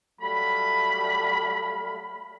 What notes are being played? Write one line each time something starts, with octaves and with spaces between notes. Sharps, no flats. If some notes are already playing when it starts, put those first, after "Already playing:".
F#3 G3 A3 F5 B5